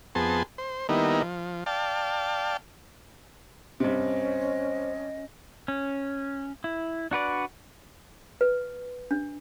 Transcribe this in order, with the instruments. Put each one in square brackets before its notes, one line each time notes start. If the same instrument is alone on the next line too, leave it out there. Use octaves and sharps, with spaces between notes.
[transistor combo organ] F2 B3 G#4 A5 C6
C5
D#3 G3 A#3 B3 D#4 E4
F3
D5 F5 G5 A5
[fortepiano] G2 C3 [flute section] C#4 D#5 [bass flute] C5
[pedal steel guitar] C#4
E4
D4 F#4 B4 D5
[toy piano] B4
D4